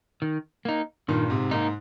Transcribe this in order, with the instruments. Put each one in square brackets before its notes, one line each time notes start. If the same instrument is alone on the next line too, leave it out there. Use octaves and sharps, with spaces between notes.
[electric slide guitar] D#3
A#3 D#4
[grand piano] G2 A#2 [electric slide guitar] D#3
[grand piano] G#2 C3
[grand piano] G#2 [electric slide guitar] A#3 D#4